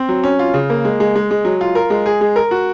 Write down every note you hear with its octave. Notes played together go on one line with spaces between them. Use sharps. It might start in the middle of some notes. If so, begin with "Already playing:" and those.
Already playing: C4
F#3
C#4
F4
C#3
A#3
G#3
G#3
G#3
G#3
F#3
F4
A#4
G#3
G#4
G#3
A#4
F#4